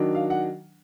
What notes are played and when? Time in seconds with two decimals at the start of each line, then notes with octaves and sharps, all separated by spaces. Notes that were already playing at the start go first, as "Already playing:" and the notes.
Already playing: D#3 F#3 D4
0.15 F5
0.30 F#5